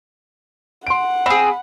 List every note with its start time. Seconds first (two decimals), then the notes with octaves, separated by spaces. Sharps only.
0.87 F#5 C6 D7
1.26 C4 G#4 B5